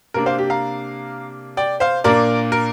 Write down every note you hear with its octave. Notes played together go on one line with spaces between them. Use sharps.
C3 A#3 D4 A#4
C5 F5
G4
F5 A#5
D5 G5
C5 F5
A#2 A#3 D4 A#4 D5
A#4